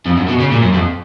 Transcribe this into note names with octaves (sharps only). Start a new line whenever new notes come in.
F2
F#2
B2
C#3
A#2
F#2
F2